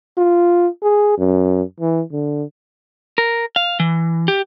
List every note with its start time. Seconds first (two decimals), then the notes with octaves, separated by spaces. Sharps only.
0.18 F4
0.83 G#4
1.18 F#2
1.80 E3
2.12 D3
3.18 A#4
3.56 F5
3.80 E3
4.28 G4